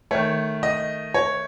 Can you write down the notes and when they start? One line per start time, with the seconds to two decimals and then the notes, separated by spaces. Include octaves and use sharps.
0.11 D#3 A3 C#5
0.63 D#5
1.14 C#5